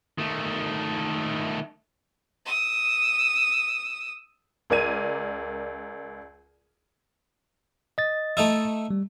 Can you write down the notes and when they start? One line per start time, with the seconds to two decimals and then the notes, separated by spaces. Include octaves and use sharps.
0.18 D#3 A3
2.45 D#6 E6
4.70 C#2 A#4 D5 G#6 D#7
7.98 D#5 A6
8.37 A3 D#4 E4
8.91 G3